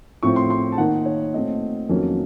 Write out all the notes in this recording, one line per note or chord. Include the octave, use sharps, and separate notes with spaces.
A2 F3 C4 C#6
C6
C6
A5
D#3 A#3 D#4 F#5
C#5
A#2 A3 C4 D#5
F2 D#3 F#3 A#3 C#4